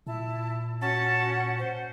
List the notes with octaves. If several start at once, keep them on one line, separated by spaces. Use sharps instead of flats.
A#2 E4 A5
C#4 F#4 F#5 A5
C5